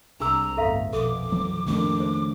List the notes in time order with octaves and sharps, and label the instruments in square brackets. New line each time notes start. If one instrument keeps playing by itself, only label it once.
[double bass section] C2 [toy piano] D4 G#4 E6 [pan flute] A#5
[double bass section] G1 E2 A2 [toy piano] A4 E5 F5
[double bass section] A#1 F2 B2 [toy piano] A4 [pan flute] D6
[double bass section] F2 [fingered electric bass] E3 F#3
[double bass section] F2 A2 A#3 [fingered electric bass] D#3 A3 D4 [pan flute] D6
[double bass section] C#3 [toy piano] C5